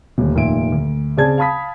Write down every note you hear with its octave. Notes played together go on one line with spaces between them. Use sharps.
D#1 D2
F1 A#2 D#3 E5 D7
D2
C#3 C4 G#4 D5 A5 G#6
F5 A5 B5 D#6 B6